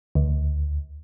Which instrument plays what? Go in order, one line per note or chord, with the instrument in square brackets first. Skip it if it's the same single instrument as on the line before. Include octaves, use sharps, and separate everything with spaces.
[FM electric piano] D2